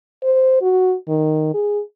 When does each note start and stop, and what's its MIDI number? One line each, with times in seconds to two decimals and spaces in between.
0.23 0.61 72
0.61 0.94 66
1.08 1.51 51
1.54 1.81 68